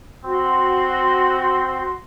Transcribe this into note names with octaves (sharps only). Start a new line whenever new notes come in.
C4 F#4 C6